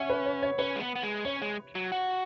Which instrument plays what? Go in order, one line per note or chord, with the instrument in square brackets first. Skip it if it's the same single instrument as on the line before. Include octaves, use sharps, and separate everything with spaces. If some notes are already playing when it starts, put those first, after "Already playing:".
Already playing: [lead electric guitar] C#4 [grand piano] C#5 E5 F#5
[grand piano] B4
C#5
C#5
[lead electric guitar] C#4 [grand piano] B4
[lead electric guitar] G#3
B3
B3
G#3
[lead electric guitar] C#4 [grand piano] C#5
[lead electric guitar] G#3
F#3
F#4